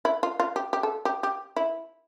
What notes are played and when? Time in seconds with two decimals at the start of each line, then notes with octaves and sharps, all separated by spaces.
0.05 E4
0.23 F4
0.40 F4
0.56 G4
0.73 G4
0.83 A4
1.05 G4
1.23 G4
1.56 E4